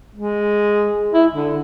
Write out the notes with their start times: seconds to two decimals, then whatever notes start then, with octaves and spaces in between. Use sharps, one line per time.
0.15 G#3
1.12 E4
1.33 D3